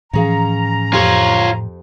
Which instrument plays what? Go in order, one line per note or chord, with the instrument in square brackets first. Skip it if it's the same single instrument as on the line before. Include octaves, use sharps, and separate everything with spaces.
[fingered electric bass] A2 E3 F3 [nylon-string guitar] C#4 G#4 F5 [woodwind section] A#5
[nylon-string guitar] F2 G4 C5 [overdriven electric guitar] F4 C#5